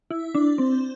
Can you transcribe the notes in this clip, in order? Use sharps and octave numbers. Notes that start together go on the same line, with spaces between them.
E4
D4
C4